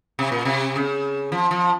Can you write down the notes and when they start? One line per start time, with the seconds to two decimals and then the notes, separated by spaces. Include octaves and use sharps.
0.19 C3
0.32 A#2
0.45 C3
0.76 C#3
1.32 F3
1.51 F3